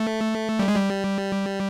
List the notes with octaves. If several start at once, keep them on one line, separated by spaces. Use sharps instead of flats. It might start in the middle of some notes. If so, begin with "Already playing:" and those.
Already playing: A3
G3
G#3
G3